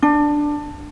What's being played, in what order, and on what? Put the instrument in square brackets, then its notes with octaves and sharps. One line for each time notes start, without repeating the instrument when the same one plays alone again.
[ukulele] D4